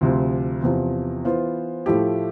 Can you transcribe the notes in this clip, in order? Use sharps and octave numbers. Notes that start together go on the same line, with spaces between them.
D2 C3 F3
E2 C3 F3
E3 B3 F4 C5
A2 F3 A3 E4 G4